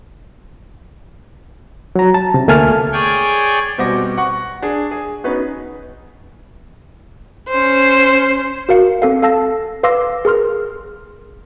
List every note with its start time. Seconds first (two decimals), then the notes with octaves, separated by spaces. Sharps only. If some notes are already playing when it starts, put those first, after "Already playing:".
1.96 F#3 A#5
2.14 A5
2.34 C3
2.48 D2 A3 A#3 G#5 A5 F6
2.93 G#4 C#5 D5 G5 G#5
3.78 B2 G3 C4 F#4 D6 A#6
4.18 F#5 C#6
4.62 D4 G#4
4.91 G#4
5.24 B3 C#4 D#4 F#4 B4
7.49 C#4 C5
8.69 F#4 A#4 F5 C#7
9.02 C4 A4 F5
9.22 A4 F5 A5 E6 A#6
9.83 B4 F5 C6 D6 E6 A#6
10.25 G#4 A#4 C6 F6